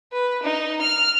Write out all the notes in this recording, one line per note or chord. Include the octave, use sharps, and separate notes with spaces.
B4
D#4
F6